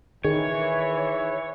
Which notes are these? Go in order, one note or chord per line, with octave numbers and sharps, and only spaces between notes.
D#3 E3 G#4 C#5